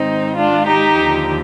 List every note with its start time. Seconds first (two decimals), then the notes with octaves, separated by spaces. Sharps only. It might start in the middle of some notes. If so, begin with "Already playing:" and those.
Already playing: G#2 D#3 C4 D#4
0.35 D4 F4
0.66 D#4 G4
0.97 D#2 D3 F3